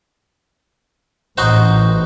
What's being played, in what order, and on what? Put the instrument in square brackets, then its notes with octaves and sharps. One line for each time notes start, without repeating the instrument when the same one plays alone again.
[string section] A1 [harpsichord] D#4 F#4 C5